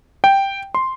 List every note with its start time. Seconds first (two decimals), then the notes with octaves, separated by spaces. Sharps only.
0.24 G5
0.75 C6